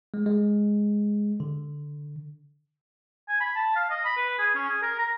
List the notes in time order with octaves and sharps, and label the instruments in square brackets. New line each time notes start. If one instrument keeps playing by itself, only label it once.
[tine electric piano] G#3
G#3
D3
[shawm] G#5
B5
A5
F5
D#5
B5
B4
G#4
C#4
G#4
A#4
A#5